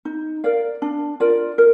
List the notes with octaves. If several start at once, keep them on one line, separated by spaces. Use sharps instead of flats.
D#4
A#4 D5 F5
D4
F4 A#4 D5
A#4